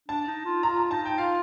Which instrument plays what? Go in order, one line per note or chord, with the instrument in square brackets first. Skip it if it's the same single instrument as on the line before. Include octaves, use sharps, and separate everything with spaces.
[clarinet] D4 [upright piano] A5
[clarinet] D#4
F4
[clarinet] F4 [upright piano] A#5
[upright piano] A#5
[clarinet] D#4 [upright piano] A5
[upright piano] G5
[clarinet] F4 [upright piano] F5